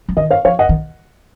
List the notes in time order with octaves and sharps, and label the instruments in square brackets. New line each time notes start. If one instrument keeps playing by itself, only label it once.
[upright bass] F3
[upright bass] D#3 [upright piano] D#5
[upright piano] C#5 F5
[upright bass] F3 [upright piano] C#5 F5
[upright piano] D#5 F#5
[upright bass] D#3